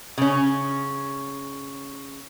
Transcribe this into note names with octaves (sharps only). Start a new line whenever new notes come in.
C#3 C#4